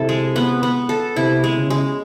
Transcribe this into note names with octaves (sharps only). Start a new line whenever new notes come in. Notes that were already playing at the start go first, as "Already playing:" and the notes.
Already playing: C3 E4 A4
G#3
B3
B3
A4
C3 E4
G#3
C#3
G#3